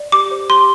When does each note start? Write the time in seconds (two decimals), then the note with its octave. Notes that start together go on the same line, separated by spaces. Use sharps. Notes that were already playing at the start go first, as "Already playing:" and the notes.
Already playing: D5
0.12 G4 D6
0.31 C5
0.50 G4 C6